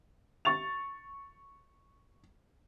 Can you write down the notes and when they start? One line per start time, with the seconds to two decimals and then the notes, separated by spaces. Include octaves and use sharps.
0.45 C#6 A6 F7